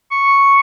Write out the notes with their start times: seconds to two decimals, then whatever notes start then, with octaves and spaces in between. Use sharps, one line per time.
0.11 C#6